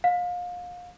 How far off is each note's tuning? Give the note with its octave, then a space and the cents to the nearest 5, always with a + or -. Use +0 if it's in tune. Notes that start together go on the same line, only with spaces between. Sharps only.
F5 +30